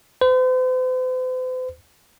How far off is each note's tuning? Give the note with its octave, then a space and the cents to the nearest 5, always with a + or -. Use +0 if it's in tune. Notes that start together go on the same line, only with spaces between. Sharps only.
C5 -45